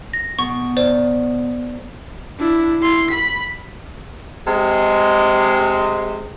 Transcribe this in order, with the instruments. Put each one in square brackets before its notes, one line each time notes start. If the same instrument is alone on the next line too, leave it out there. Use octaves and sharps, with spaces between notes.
[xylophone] A#6
[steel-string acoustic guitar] B2 [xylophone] C#6
[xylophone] C5 D5
[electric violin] D4 E4
E4 C6
B5 B6
[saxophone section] C3 G#3